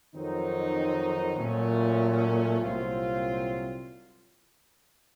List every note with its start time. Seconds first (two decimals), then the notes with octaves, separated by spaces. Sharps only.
0.14 F2 D#3 F#3 C4 D#4
1.37 A#2 F#3 A3 C#4
2.59 C2 A#2 F#3 C4 F4